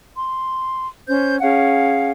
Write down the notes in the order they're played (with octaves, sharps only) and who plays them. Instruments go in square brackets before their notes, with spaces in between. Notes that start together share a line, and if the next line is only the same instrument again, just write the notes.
[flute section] C6
C#4 C5 G6
C#4 G#4 F5 F#5